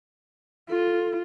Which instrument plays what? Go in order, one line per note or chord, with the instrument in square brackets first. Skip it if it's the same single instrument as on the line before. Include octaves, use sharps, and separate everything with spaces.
[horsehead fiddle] F4 [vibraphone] A4